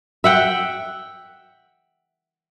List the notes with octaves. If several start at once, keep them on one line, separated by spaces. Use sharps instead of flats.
E5 F#5 G5